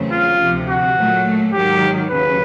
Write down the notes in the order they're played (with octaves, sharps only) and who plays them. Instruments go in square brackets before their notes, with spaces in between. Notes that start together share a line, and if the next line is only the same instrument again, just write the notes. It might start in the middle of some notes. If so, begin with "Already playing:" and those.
Already playing: [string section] E2 C#3 F#3 A3 C4
[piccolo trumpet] F4
[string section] D2 C3 F3
[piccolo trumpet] F#4
[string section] A#2 F#3 A3
[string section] G#2 D#3 F#3 [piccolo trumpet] G4
[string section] D#2 C#3 F#3 [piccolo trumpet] B4